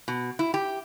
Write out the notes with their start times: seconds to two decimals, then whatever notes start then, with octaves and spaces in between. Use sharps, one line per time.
0.08 B2
0.39 E4
0.54 G4